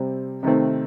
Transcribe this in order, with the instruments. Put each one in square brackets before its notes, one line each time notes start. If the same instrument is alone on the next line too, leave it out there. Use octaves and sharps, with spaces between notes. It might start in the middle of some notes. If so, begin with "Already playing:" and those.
Already playing: [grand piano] C3 G3 C4
C3 D#3 A3 C4